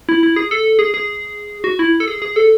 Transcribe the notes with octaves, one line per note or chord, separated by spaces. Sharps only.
E4
E4
G#4
A4
G#4
G#4
F#4
E4
A4
G#4
G#4
A4